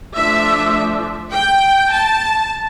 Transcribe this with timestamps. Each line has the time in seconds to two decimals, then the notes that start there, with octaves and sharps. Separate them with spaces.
0.16 F3 A3 D4 E5
1.33 G5
1.92 A5